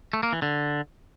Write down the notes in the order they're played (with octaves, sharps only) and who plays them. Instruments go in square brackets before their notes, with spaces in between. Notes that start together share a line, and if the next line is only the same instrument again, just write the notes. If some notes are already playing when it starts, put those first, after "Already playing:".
[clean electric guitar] A3
A#3
E3
D3